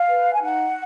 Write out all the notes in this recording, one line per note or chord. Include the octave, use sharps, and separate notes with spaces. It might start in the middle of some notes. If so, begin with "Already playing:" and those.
Already playing: F5
B4
G#5
D#4 F#5